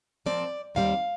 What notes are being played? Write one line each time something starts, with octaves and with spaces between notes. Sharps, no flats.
A#2 F3 C4 D5
D#2 D3 G3 C4 F5